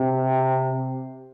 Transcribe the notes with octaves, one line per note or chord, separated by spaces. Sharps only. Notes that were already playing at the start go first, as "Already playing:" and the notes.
Already playing: C3